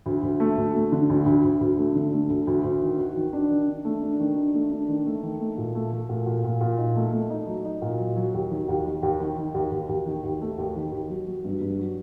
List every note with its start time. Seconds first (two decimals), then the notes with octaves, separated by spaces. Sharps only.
0.06 D2
0.23 D2
0.40 A3
0.58 D2
0.75 A3
0.92 D3
1.10 D2
1.26 D2
1.44 D2
1.61 D2
1.79 A3
1.95 D3
2.13 A3
2.30 D2
2.47 D2
2.64 D2
2.82 D#3
2.99 F#4
3.16 D#3
3.33 D4
3.51 D#3
3.68 D4
3.85 A3
4.03 D4
4.20 D#3
4.37 D4
4.54 A3
4.72 D4
4.89 D#3
5.06 A3
5.23 D#3
5.40 A3
5.58 A#2
5.75 A3
5.93 A3
6.09 A#2
6.26 A#2
6.44 A#2
6.61 A#2
6.78 D#4
6.96 A3
7.13 A3
7.30 D#4
7.47 F#3
7.65 D#4
7.82 A#2
7.99 F#3
8.16 F#3
8.34 D#2
8.51 D#3
8.68 D#2
8.86 D#3
9.03 D#2
9.20 D#3
9.38 D#3
9.54 D#2
9.72 D#2
9.89 D#2
10.06 D#3
10.24 D#2
10.41 A3
10.58 D#2
10.75 D#3
10.92 D#2
11.10 F#3
11.27 F#3
11.44 G2
11.61 G2
11.79 F#3